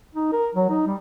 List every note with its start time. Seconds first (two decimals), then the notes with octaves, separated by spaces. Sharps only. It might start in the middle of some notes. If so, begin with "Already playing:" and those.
0.15 D#4
0.32 A#4
0.54 F#3
0.70 D#4
0.87 G3